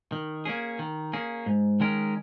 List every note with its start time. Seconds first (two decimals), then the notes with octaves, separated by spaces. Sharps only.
0.12 D#3
0.45 A#3 C#4 G#4
0.79 D#3
1.13 A#3 C#4 G#4
1.46 G#2
1.80 D#3 G#3 C#4 A#4